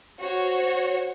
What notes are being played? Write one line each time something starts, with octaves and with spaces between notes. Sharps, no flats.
F#4 C5 C#5